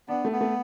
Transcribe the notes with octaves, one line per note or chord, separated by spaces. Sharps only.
B3 D4
A3
B3
A3